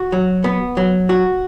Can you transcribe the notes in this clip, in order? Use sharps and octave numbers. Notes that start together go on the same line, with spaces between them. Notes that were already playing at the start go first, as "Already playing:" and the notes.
Already playing: F#4
F#3
B3
F#3
F#4